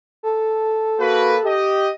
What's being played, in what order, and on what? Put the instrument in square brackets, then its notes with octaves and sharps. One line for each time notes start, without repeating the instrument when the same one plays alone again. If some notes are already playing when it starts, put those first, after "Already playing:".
[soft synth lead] A4
[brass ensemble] A#3 F#4 B4
G4 D#5